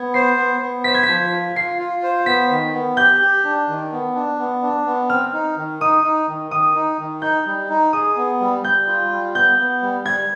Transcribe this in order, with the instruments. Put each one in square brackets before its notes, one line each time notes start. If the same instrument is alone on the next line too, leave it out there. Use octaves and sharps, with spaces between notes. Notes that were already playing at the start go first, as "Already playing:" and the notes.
Already playing: [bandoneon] B3 [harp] G#6
[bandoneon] C5 [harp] C7
[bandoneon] B3
B3
[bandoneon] C5 [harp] B6
[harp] G#6
[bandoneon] F3 [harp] B6
[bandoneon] F4
[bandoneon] F4 [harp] C7
[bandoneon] F4
C5
[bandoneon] B3 [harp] B6
[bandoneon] D#3
B3
[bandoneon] G4 [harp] G6
[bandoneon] G4
D4
D#3
B3
D4
B3
D4
B3
[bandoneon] C4 [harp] F6
[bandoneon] D#4
D#3
[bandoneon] D#4 [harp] D#6
[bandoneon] D#4
D#3
[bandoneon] D#3 [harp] D#6
[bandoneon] D#4
D#3
[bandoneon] D#4 [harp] G6
[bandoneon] G3
D#4
[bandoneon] G#4 [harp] D#6
[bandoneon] B3
G3
[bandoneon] G3 [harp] G6
[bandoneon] F4
G3
[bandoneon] B3 [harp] G6
[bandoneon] B3
G3
[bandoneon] G3 [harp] G#6